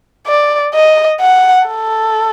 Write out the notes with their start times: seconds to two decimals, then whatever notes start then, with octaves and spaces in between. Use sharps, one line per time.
0.26 D5
0.74 D#5
1.20 F#5
1.67 A4